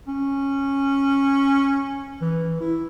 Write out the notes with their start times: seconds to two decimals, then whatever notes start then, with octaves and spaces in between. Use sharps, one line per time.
0.08 C#4
2.21 E3
2.61 E4